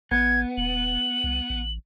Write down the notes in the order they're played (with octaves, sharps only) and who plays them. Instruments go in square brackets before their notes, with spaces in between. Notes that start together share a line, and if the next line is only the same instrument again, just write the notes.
[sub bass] A1 [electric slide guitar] B3 [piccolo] G#6
[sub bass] D#1 [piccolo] F#7
[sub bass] C2
A1